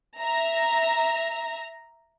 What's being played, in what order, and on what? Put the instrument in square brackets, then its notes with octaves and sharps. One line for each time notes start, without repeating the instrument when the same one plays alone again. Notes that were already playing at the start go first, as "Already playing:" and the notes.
[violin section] E5 A#5